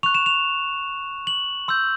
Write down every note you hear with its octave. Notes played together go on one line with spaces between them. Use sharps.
C#6 F#6 F7
E7
F7
F#7
C6 E6 G6